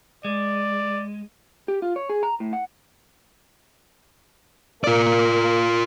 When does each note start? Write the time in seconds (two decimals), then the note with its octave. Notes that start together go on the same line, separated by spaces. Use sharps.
0.25 G#3 D5
1.68 G4
1.82 F4
1.96 C#5
2.09 G#4
2.23 A#5
2.40 A2
2.53 F#5
4.84 A#3 F4 D5